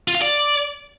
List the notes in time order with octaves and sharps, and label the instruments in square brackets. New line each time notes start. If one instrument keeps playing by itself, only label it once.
[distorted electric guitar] F4
F5
D5